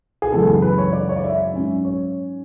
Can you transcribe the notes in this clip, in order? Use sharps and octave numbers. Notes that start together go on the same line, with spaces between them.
G#4
F#2 C#3 E3 G#3 B3 A4
G#4
B4
C#5
D5
C#5
D5
E5
G#2 F#3 C#4
C#5